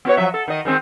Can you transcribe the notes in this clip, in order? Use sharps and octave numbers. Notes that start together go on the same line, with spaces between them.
B3 F#4 C#5
F3 F#3 E5
A4
D#3 D#5
D#3 G#3 C4